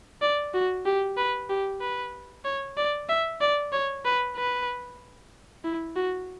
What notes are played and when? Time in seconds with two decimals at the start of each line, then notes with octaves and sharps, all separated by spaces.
0.22 D5
0.54 F#4
0.86 G4
1.18 B4
1.49 G4
1.82 B4
2.45 C#5
2.77 D5
3.09 E5
3.41 D5
3.73 C#5
4.05 B4
4.36 B4
5.64 E4
5.96 F#4